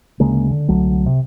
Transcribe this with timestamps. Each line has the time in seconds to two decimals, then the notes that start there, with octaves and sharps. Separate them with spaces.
0.20 D2 C#3 G#3 A#3
0.51 D3
0.68 C2 D3 F#3 A3
1.06 C3